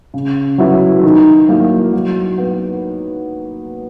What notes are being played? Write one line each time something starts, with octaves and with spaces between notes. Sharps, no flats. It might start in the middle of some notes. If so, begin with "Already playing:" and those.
C#3
F#3 B3 E4
D#3
F#3 A#3 E4
F#3
B3